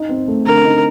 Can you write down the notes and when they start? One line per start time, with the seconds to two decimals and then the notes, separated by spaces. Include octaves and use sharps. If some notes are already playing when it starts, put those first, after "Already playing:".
Already playing: D#4
0.09 C4
0.28 A3
0.46 D3 A#4
0.65 D#4